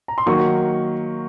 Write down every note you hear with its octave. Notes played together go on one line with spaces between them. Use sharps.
A#5
C6
D#3 F#3 A#3 C#6